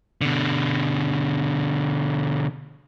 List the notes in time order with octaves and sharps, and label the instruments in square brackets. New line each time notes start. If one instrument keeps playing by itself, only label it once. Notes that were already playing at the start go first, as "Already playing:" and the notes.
[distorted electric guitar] B2 D3